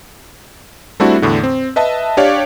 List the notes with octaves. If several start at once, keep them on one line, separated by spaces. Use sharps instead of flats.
G3 A3 C4 D4 E4 F#4
E2 A2 D3
C4
B4 D#5 E5 A5
D4 G4 C#5 D5 F5